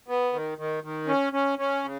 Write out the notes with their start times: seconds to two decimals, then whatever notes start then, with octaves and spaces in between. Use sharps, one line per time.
0.08 B3
0.33 D#3
0.58 D#3
0.83 D#3
1.08 C#4
1.33 C#4
1.59 C#4
1.84 C#3